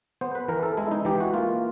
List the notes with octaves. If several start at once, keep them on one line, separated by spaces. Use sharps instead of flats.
B3 C5
B4
E3 A#4
A4
G#3 E4
D#4
E3 G4
F#4
A#3 F4